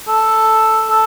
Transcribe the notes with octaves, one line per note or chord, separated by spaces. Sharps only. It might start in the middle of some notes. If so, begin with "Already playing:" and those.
A4
A4